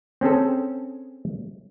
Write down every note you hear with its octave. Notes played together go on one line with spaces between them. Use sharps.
C4 C#4 G#4 A4